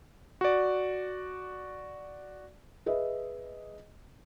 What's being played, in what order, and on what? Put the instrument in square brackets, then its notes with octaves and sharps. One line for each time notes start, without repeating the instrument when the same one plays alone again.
[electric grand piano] F#4 D5
[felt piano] G#4 B4 D#5 E5